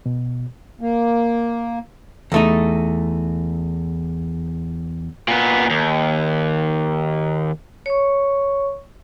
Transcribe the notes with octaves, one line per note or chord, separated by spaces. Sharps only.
B2
A#3
E2 A3 D#4
A#2 B3
D#2
C#5 C#6